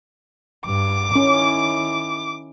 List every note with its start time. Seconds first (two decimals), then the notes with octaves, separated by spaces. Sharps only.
0.66 G2 D6
1.16 D#3 C#4 E4